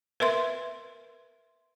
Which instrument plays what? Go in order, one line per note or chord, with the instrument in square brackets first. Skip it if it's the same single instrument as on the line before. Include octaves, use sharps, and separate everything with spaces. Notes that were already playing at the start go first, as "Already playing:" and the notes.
[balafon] A#4 B4 E5 C6